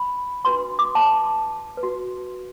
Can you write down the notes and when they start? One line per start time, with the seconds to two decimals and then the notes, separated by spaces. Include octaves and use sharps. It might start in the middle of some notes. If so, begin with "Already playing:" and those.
Already playing: B5
0.45 D4 F#4 B4 C6
0.79 D6
0.95 A5
1.77 B4
1.83 F#4